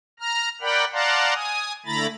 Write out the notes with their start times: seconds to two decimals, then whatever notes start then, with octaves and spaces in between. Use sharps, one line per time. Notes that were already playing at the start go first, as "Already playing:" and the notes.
0.20 A#5 F6
0.61 A#4 D5 F#5 G5 B5
0.93 D5 F5 F#5 A5 A#5 C6
1.35 G#5 D#6
1.86 D3 A3 E4 A#5 B5 A6